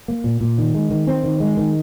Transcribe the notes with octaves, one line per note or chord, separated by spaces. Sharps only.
A#3
A#2
A#2
D#3
G#3
D#3
C4
D#3
G#3
D#3